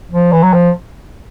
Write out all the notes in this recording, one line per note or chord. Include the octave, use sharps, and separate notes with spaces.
F3
E3
F#3
F3